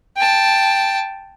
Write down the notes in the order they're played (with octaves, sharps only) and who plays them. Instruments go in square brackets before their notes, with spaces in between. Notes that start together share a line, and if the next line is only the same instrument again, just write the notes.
[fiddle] G5 A5